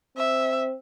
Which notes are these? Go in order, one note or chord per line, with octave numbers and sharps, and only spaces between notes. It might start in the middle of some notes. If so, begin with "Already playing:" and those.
C4 E5